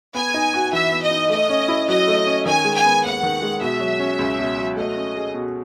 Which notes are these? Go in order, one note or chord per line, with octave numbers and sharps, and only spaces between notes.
B3 G#5
D#4
F#4
E3 E5
B3
D#5
D#4
A3 D#5
C#4
E4
F#3 D#5
A3
C#4
D#3 G#5
G#3
G#5
B3
D#2 F#5
D#3
G#3
B2 E5
F#3
C#4
C#2
B2
F#3
A3 D#5
C#4
G#4
B2